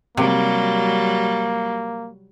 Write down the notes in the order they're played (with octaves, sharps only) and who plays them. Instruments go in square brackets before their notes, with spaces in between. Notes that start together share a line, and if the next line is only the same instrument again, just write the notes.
[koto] C3 [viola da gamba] F#3 G3 [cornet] A#3